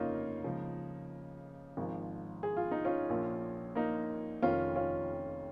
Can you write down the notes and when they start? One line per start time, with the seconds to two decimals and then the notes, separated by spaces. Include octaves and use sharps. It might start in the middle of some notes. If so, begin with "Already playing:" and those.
Already playing: F1 C#3 A#3 C#4 D#4 F4
0.44 C#2 C#3 F3
1.77 G#1 G#2 F3
2.43 G#4
2.57 F4
2.71 D#4
2.85 C#4 F4
3.09 A#1 A#2 F3
3.75 A#3 D#4
4.42 F1 F2 D#3 C#4 F4
4.76 C#4 F4